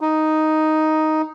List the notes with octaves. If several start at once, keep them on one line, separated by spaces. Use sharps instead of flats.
D#4